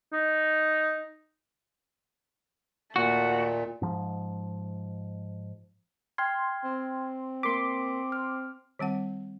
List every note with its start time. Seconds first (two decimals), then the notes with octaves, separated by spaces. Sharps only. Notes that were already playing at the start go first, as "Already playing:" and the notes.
0.13 D#4
2.96 D#2 A#2 A3 F#4
3.82 G#2 F3
6.18 G5 C6 F6 G#6
6.64 C4
7.43 A#3 A#4 C6 D6 B6
8.12 F6
8.79 D#3 G3 C4 F#5